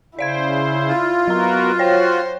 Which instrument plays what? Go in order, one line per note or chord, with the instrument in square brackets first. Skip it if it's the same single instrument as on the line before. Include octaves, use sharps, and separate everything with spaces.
[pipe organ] C#3 C5 [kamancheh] E4 [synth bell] D5 F5 G#6
[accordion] F4
[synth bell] F#3 A#5 [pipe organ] B3 F#4 A#4
[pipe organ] F#4 [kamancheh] C5 [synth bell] C#5 G5